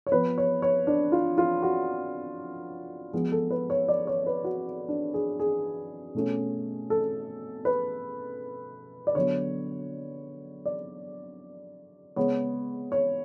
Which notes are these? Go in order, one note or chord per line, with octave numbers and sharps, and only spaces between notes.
C#5
F3 B3 B4
C#5
C#5
D4
F4
F4
F#4
F3 G#3 B3 G#4
A4
B4
C#5
D5
C#5
B4
F#4
D4
G#4
G#4
B2 A3 C#4
A4
B4
D5
D3 F#3 B3 C#5
D5
C#3 G#3 B3 C#5
C#5